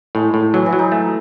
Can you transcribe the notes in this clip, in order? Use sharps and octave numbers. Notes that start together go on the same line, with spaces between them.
A2 G#3
A2
E3 F#3
E3
F#3
D#4
A3